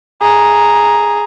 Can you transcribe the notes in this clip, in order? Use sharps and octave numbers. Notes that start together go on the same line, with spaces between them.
G#4 A#5